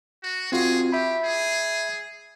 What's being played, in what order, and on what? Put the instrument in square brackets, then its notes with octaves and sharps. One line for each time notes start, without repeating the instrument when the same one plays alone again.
[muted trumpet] F#4
[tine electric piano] C4 F4 F#4 [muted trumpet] G#4
[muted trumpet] G4 [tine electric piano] E5 B5
[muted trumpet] G#4